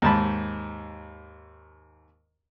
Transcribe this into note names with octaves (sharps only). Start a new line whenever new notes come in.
D#2 G#2 A5 B5